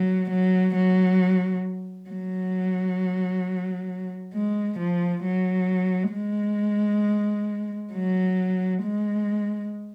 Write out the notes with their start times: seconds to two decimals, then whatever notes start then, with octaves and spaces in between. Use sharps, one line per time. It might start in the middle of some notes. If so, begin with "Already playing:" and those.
Already playing: F#3
0.30 F#3
0.75 F#3
2.09 F#3
4.33 G#3
4.78 F3
5.24 F#3
6.13 G#3
7.93 F#3
8.82 G#3